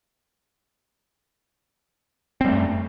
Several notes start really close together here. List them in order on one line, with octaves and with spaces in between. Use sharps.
C4 G3 A3 F#2